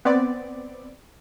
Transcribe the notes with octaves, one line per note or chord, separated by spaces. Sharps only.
B3 C4 D5